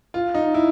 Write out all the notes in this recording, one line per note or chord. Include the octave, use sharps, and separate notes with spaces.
F4
D#4
E4